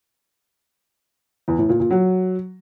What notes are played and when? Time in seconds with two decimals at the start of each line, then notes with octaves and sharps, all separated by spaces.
1.48 E2
1.59 A2
1.69 A#2
1.80 A#2
1.90 F#3